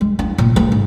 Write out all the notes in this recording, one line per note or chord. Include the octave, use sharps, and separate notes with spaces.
G#3
E4
A#2
A3
G#2